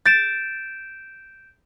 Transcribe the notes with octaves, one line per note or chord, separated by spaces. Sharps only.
G6 A6 D7 E7